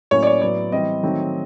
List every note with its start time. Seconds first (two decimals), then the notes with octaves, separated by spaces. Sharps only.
0.11 A2 F#3 A#3 C#4 C#5
0.23 D5
0.27 C#5
0.42 A2 F#3 B3 D5
0.72 E3 G3 C4 D#5
1.03 D#3 F#3 A3 C4